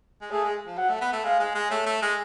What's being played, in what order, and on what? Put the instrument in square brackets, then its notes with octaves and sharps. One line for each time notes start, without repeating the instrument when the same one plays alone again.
[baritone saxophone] G#3
[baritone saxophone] A3 [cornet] G#4
[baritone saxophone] G#3
F3
[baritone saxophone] F#3 [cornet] F#5
[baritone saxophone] A3
B3
A3
[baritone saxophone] G#3 [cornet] F5
[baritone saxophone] G#3
G#3
[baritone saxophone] A3 [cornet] C#5
[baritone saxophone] A3
G#3